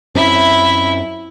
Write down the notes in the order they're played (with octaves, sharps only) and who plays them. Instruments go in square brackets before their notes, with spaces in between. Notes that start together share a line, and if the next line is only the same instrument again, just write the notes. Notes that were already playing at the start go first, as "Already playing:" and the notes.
[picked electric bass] F#2 C4 C#4 [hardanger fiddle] E4 E5